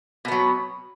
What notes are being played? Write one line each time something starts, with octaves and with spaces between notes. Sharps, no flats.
B2 F#3 B3